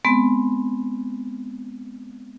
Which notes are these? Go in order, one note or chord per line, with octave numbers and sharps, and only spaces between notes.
G#3 B3 C4